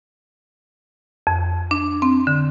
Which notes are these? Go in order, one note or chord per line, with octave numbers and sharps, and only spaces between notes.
F2
D4
C4
D3